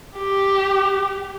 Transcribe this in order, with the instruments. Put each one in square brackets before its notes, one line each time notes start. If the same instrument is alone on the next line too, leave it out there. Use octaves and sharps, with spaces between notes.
[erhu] G4